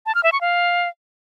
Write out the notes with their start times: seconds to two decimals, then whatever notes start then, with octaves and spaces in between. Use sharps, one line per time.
0.06 A5
0.15 F6
0.24 E5
0.32 C#6
0.41 F5